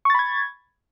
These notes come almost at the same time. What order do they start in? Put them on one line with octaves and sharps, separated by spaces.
C#6 A6 B5 G#6